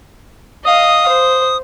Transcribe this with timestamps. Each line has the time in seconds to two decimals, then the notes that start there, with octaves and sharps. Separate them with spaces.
0.65 D#5 F5 D#6
1.08 C5